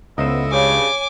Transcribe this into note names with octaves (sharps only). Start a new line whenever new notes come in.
C#2 B3 E4 A4 C5 D#5
G2 C#3 C#5 G#5 D6